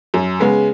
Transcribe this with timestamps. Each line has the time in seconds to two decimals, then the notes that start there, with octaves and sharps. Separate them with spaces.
0.14 F#2
0.40 C#3 G#3 B3